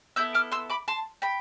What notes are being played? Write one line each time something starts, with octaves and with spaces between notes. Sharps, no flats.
B3 E4 A4 E6 G6
D6 F6
C6 E6
B5 D6
A5 C6
G5 B5